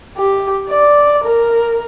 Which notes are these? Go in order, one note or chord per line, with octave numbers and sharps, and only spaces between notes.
G4
D5
A#4